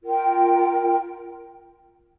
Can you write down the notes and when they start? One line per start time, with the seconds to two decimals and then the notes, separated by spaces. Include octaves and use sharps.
0.03 F4 A#4 G5